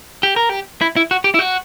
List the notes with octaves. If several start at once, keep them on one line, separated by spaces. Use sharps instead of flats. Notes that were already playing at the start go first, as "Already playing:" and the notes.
G4
A#4
G4
E4
E4
F#4
G4
E4
F#4